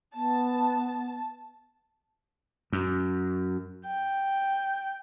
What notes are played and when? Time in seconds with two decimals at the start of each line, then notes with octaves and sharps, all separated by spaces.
0.15 B3 A5
2.73 F#2
3.87 G5